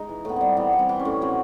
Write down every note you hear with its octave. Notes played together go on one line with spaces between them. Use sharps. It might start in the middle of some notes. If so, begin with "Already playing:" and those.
Already playing: G#3 D#4
E3
A2 B3
G3 C4
E3 B3
G3
C4
E3
C#4
A2
F#3 C4